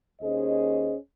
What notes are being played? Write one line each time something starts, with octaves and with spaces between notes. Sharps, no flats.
D#2 C#4 G#4 C5 D#5